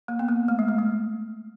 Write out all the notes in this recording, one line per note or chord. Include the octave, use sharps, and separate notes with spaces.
A#3
B3
A#3
A3
G#3
A3
G#3